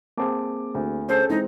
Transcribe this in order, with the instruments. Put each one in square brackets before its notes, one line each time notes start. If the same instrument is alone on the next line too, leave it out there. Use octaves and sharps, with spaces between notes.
[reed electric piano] A#3 C4 G#4 [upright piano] A5 D6
[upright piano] D2
[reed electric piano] C#4 G#4 A4 [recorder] C5
[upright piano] E3 G#3 C4 [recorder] D#4